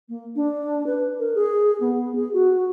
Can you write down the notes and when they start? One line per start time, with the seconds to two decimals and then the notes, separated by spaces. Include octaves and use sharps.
0.09 A#3
0.36 D4
0.86 B4
1.19 A#4
1.35 G#4
1.80 B3
2.15 G#4
2.33 F#4